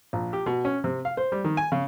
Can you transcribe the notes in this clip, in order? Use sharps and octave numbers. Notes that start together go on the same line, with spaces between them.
A#1
G4
B2
C#4
C3
F5
C5
G3
D#3
G#5
C#3